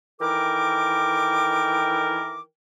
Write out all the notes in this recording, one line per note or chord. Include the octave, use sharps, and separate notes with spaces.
D#3 E3 A4 A#4 G5 D6